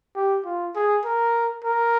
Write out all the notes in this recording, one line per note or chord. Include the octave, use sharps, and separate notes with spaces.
G4
F4
G#4
A#4
A#4